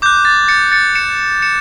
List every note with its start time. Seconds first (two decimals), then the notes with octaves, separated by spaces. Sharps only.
0.02 D6 F#6 G6
0.25 A6
0.48 A6 C#7
0.72 A6 C#7
0.95 C#7 E7
1.42 C#7 E7